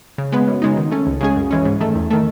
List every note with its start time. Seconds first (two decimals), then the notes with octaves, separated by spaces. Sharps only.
0.18 C#3
0.32 G#3 B3
0.48 F#2
0.62 C#3 G#3 D#4
0.77 D#3
0.91 A3 C#4
1.07 C#2
1.21 C#3 G#3 C#4 G#4
1.36 F#2
1.51 C#3 E3 G#3 C#4
1.65 G#2
1.80 D#3 A3
1.95 E2
2.11 D#3 A3